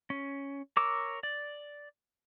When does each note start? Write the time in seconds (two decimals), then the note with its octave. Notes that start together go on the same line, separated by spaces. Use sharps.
0.10 C#4
0.77 A#4 C#5 D6 E6
1.23 D5